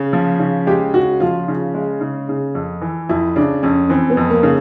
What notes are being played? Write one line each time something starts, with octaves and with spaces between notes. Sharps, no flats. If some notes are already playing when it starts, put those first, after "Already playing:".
Already playing: C#3
F3
C#3
G#3 G4
C#3 F#4
F3 F4
C#3
G#3
C#3
C#3
F2
E3
F2 E4
C#3 D4
F2 C#4
E3 C4
B3
F2
A#3
C#3